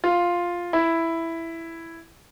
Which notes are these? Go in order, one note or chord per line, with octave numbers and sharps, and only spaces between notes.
F4
E4